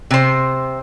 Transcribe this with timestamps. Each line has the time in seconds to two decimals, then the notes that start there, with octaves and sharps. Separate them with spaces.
0.11 C3 C5